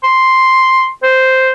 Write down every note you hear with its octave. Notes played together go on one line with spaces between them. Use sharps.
C6
C5